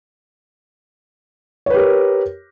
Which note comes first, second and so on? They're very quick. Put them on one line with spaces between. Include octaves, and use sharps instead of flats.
C#5 B4 G4 A#4